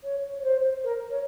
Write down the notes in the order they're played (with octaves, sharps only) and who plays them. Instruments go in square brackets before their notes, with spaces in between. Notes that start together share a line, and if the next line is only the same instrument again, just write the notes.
[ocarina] C#5
C#5
C5
A#4
C#5